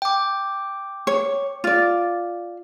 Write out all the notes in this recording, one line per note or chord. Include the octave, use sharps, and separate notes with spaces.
G5 D6
C#5
F4 D5